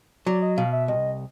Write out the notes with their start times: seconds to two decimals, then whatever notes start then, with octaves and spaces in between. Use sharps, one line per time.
0.26 F#3 D5
0.42 D#5
0.57 B2 F5
0.73 E5
0.88 C2 D#5